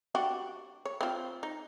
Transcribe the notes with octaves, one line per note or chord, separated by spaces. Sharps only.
D4 F#4 G4
C#5
C4 F4
D#4